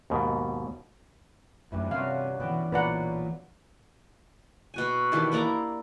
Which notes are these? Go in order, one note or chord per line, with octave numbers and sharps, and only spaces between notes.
D#2 G#2 B2
F#2 A2 E3 G3 D4
G2 C3 C#4 F4 F#4 F5
B2 E3 B3 D5 G5 F#6
B1 A#2 B4 D5 F#5 A#5 B5
B2 F#4 G#5
D#3 E3 D4 G4
A#3 E4 D5 A#5